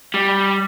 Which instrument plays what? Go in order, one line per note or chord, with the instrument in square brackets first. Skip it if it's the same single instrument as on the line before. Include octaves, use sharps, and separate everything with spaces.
[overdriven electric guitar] G3